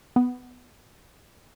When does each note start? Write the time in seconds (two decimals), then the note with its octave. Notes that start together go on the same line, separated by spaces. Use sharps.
0.16 B3